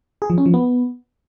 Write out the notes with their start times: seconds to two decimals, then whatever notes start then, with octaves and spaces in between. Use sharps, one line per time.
0.22 G#4
0.30 F3
0.38 C#4
0.46 F3
0.54 B3